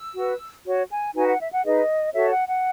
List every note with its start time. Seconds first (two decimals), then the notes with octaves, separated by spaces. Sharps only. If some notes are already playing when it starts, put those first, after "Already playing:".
Already playing: E6
0.15 F#4 B4
0.65 F#4 C#5
0.89 G#5
1.14 D#4 F#4 B4 G#5
1.26 F#5
1.38 E5
1.50 F#5
1.64 D#4 G#4 B4 D#5
2.13 F#4 A4 C#5 E5
2.30 F#5
2.47 F#5